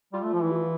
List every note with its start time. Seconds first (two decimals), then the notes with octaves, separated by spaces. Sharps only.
0.13 G3 F4
0.23 A3
0.33 F3
0.42 E3 E4
0.51 G4
0.56 F4